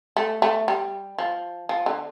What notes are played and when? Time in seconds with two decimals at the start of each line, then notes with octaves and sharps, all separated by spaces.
0.17 A3
0.42 A3
0.68 G3
1.18 F3
1.69 F3
1.86 D3